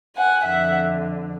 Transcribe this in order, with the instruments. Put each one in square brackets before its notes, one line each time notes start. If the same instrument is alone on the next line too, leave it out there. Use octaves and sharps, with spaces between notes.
[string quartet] F#5 G#5
F2 D3 E5 F#5